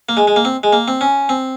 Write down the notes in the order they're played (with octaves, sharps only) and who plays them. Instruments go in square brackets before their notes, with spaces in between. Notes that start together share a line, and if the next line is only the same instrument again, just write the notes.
[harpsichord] A#3
G#3
G#3
A#3
C4
G#3
A#3
C4
C#4
C4